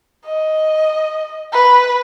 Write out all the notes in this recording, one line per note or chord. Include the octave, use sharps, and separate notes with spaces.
D#5
B4